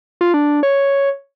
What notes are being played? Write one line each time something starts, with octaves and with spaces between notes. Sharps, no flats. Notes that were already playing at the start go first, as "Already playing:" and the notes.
F4
D4
C#5